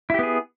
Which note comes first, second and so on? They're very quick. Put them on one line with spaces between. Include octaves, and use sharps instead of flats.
E4 G4 B3 G#4